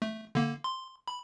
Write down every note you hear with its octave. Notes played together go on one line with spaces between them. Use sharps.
A3
D3 A#3
C6
B5